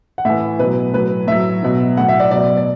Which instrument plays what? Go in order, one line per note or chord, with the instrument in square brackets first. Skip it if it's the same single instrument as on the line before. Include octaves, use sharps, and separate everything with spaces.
[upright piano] F#5
A2 E3 E5
B2 F#3 B4
A2 F#3 B4
A2 F#3 E5
B2 F#3
A2 F#3 F#5
E5
D5
B2 F#3 D5
D5